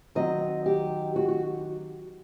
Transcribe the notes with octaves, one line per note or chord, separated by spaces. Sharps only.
D#3 F#3 C4 D#5
G4
F#4
F#4